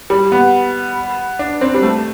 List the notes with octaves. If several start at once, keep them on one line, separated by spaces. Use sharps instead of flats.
G3
B3
D4
C4
G3
A3